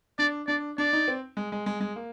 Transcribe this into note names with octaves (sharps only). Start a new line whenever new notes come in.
D4 D5
D4 D5
D4 D5
D#4
C4
G#3
G#3
G#3
G#3
A#3